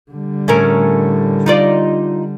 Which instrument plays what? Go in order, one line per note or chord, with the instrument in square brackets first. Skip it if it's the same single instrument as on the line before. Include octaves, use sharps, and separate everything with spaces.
[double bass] D3 G3
[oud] A2 C#4 A#4
D#4 F4 D5